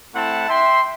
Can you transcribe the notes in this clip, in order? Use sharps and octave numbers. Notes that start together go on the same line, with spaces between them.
A3 C4 E4 F#5 A5
E5 G5 C6